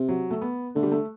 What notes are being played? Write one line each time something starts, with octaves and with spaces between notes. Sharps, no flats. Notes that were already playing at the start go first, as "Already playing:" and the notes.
Already playing: C3
F#3
A3
B3
D3 A3
G3
A3